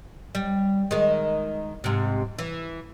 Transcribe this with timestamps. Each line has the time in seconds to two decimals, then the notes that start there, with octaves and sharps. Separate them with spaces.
0.35 G3
0.91 D#3 G#3
1.84 G#2 C3
2.39 E3